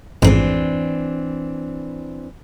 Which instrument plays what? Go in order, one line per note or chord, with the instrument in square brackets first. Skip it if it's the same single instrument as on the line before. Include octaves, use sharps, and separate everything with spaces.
[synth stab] A1 F2 G#2 [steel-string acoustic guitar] E3 C4 D4